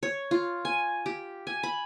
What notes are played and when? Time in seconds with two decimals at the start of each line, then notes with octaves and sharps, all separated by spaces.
0.03 C#5
0.31 F4
0.65 G#5
1.06 G4
1.47 G#5
1.63 B5